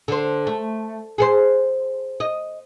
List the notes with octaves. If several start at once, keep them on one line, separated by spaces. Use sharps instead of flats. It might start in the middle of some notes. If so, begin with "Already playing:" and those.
D3 C5
A3
G#4 A4 C5
D#5